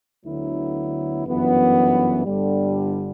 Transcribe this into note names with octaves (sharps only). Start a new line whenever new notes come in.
D2 D3 F#3 B3 E4
G1 F#2 E3 B3
G1 G2 D3 G3